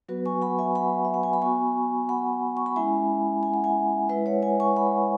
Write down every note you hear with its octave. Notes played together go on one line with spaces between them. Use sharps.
F#3 B3 F#4 B4
G#5 C#6
F#5 B5
E5 G#5
F#5 B5
E5
F#5
G#5
B5
B3 F#4 G#5 C#6
F#5 B5
C#6
B5
G#3 C#4 E4 E5 G#5
G#5
F#5
E5 G#5
G#3 E4 B4 E5
C#5 F#5
E5 G#5
G#5 C#6
F#5 B5